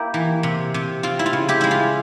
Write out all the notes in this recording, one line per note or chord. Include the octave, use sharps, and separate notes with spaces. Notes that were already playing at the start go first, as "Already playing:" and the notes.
Already playing: A#3 E4 G4
E3
C3
C3
C4 F4
E4
F4
C#3
E4 G4
G#3 E4
F4